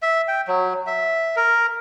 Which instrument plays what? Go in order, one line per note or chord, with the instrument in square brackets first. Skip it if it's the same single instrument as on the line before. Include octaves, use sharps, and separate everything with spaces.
[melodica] E5
G5
F#3
E5
A#4